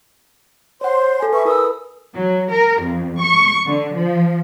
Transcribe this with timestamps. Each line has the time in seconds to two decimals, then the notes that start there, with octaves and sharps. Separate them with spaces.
0.81 C5 C#5 F#5 C6
1.20 A4 G#5
1.33 B4 E5 C#6
1.45 E4 A#4 B4 D#6 E6
2.14 F#3
2.51 A#4
2.81 F2
3.19 C#6
3.66 D3
3.95 F3